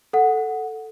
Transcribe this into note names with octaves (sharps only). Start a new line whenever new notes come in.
A4 F#5